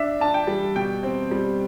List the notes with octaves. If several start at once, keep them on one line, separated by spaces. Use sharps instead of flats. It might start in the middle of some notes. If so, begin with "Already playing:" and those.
Already playing: D4 E5
D4 A5
G5
G3
B2 G5
C4
G3